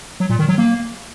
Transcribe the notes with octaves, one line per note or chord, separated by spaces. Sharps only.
F#3
A#2
D#3
F#3
A#3